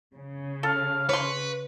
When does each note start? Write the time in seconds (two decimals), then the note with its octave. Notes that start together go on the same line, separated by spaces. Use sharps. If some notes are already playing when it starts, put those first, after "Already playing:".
0.15 C#3
0.63 A4 F5
1.09 B4 C#5 C6 C#6